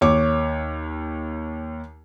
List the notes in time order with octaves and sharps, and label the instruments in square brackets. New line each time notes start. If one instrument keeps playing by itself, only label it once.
[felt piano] D#2 C#5 D6